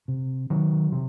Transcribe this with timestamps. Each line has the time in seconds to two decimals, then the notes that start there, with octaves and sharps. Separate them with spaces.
0.08 C3
0.50 D#3 F#3
0.92 C3